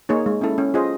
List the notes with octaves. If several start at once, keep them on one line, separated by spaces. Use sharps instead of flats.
A#3 D#4 G#4 C#5
G#3
C#4 E4 A4
C#4
F4 G#4 C5 D#5